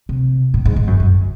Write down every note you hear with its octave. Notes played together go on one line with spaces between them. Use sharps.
C3
A2
G#2
G#2
F#2
F#2